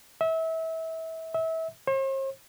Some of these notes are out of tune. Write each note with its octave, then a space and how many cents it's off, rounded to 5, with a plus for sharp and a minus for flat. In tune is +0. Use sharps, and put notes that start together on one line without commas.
E5 -30
E5 -30
C5 +45